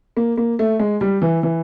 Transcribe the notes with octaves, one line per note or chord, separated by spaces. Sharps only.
A#3
A#3
A3
G#3
G3
E3
E3